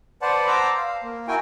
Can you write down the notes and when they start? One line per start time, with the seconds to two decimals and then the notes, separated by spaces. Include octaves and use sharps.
0.22 B4 C5 D5 F#5 A5
0.47 C5 A5 A#5 D6 E6
0.78 F5
1.03 A#3
1.28 E4 F#4 A#4 G5 G#5